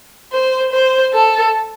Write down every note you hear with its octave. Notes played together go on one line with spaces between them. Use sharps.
C5
C5
A4